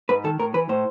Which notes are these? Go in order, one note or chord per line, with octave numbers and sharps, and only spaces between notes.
G#2 B4
D#3 A4
A2 A#4
E3 B4
A2 C5